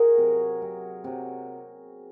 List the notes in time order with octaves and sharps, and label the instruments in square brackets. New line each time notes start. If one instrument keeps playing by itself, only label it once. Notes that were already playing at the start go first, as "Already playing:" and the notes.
Already playing: [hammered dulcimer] F#4 G#4 A#4
C3 F#3
C3 F#3
C3 F#3